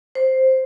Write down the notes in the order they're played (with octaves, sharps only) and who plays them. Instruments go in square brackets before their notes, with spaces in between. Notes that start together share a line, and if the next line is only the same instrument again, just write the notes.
[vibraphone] C5